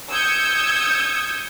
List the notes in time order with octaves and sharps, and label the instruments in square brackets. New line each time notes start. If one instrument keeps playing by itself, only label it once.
[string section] D#6 E6 G6 G#6 C#7